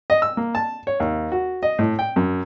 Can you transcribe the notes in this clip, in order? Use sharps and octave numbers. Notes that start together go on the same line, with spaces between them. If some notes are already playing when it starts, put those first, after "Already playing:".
D#5
E6
A#3
A5
C#5
D#2
F#4
D#5
A2
G5
F#2